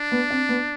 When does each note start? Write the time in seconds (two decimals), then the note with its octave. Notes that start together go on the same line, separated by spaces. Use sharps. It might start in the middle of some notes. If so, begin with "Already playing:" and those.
Already playing: D4
0.12 B3
0.30 C4
0.49 B3